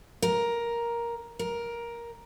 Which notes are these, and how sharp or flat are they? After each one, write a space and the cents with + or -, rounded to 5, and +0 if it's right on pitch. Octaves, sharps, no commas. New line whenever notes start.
A#4 +10
A#4 +10